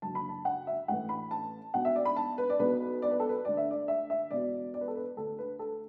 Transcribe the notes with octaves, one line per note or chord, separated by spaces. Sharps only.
F#1 F#2 D3 A5
B5
A5
F#5
E5
A1 A2 E3 F#5
B5
A5
B1 B2 F#5
E5
D5
B5
A5
B4
D5
B1 B2 B4
D5
B4
A4
B4
D2 D3 D5
E5
D5
E5
E5
E1 E2 B2 D5
D5
B4
A4
B4
D2 D3 A4
B4
A4